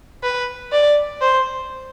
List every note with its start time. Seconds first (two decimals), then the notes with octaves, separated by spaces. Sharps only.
0.23 B4
0.72 D5
1.21 C5